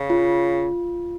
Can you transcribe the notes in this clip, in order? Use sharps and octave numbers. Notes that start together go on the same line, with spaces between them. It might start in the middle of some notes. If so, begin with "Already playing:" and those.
Already playing: C#3
F4